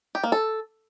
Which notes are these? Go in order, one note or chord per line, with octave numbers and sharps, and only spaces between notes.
G4
A#3
A4